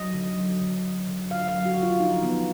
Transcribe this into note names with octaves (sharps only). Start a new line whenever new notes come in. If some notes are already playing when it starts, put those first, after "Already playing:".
Already playing: F#3 D#5
D3
F#3
D3
D3
D3
D3 F5
F5
F#3
F#4
D3
F4
F3 D#4
D3 B3